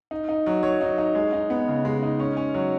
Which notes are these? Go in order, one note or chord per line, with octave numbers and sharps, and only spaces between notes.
D#4
D#4
F#3
F#3 C#5
D#4
D#4
G#3
D#4
B3
C#3
G#3
D#4
C#4
C#4
F#3